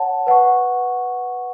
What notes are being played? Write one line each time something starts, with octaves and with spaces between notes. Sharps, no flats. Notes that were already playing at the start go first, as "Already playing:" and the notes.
Already playing: C#5 F#5 A5
B4 F#5 C#6